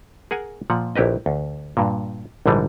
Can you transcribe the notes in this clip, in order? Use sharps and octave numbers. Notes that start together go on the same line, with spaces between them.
G#4 A#4 F#5 G#5
A#2 F3 F#5
A#1 E4 G4 B4 D#5
D2
G2 A#2
A#1 G#2 D3 E3 G3